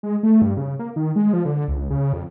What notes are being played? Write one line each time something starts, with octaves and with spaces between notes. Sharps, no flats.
G#3
A3
G2
C#3
A#3
D#3
G#3
F3
D3
C#2
C#3
F2